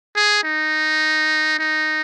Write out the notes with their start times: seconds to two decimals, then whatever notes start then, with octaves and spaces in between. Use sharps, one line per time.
0.16 G#4
0.43 D#4
1.59 D#4